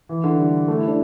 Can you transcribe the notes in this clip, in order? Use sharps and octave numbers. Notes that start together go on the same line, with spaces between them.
E3
D3
G3
A3
E4
D4